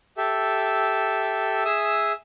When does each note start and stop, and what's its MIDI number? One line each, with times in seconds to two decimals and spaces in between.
0.17 1.64 67
0.17 1.64 69
0.17 1.64 76
1.65 2.12 68
1.65 2.12 76
1.65 2.12 87
1.65 2.12 88